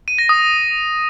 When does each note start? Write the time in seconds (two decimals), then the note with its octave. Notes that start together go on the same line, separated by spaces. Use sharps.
0.08 D#7
0.18 A#6
0.29 D#6